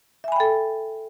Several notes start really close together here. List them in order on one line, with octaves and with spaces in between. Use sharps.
E5 G#5 B5 G5 A4